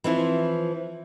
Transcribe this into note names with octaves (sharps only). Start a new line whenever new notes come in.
E3 F3 C4 E4